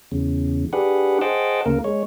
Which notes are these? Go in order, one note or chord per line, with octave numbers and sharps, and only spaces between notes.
E2 C#3
D4 G4 G#4 B4 F#5
G#4 C5 D#5 F#5 G5 A5
D2 C#3 A#3 A#4
G#3 C#5